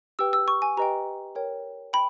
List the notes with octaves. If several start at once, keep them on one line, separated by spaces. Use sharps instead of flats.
G4 B4 G5 E6
E6
C#6
G#5
G4 B4 D#5 G5 A#5
A#4 C#5 G5
G5 B5